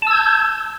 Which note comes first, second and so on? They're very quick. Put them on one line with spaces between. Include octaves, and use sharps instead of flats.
A5 E6 G#6 G6